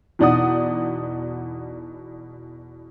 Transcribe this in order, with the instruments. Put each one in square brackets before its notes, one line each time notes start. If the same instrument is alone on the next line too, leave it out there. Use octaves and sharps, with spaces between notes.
[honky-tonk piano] E2 B2 D#4 D5 F#5 D#6